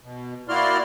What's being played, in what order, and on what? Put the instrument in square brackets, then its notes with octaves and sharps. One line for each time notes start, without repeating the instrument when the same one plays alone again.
[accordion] B2
A#3 E4 F#4 D5 C6 F6